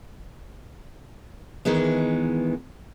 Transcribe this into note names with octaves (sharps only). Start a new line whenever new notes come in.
D#3 E3 G#3 B3